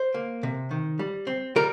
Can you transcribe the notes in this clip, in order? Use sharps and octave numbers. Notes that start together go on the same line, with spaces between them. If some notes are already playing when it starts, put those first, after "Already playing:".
Already playing: C5
A#3
C3
D#3
G3
C4
G3 A#4